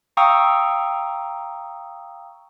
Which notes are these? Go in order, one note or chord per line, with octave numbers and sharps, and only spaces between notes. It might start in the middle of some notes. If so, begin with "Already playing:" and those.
F5 G5 A#5 C#6 D#6 E6